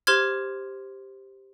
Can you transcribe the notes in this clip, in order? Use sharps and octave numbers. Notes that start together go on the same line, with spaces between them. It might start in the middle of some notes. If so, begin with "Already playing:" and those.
G4 C5 C6 F6 G#6